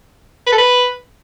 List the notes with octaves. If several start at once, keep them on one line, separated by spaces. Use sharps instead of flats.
B4
A4
B4